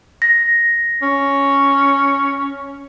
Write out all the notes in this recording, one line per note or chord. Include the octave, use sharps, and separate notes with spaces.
A#6
C#4